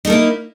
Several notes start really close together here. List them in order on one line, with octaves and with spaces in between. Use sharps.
D#4 A4 A#3 E4